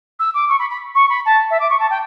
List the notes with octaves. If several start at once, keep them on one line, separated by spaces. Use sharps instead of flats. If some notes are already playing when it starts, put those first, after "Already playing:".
E6
D6
C#6
B5
B5
C#6
B5
A5
E5
D6
C#6
A5
G5